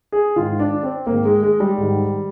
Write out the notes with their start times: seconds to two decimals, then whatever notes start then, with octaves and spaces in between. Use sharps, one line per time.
0.12 G#4
0.36 G#2 D#3 F4
0.60 D4
0.83 C4
1.07 G#2 D#3 A#3
1.25 G#3
1.43 G#3
1.60 G3
1.78 G#2 D#3